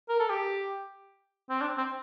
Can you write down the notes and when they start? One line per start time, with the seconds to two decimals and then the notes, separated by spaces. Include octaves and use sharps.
0.09 A#4
0.20 A4
0.30 G4
1.50 C4
1.61 D4
1.78 C4